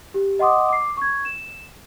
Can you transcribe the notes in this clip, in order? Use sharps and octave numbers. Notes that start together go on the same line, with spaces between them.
G4
D#5 F#5 C6 D6 D#6
D6 C7
C#6 G#6
E7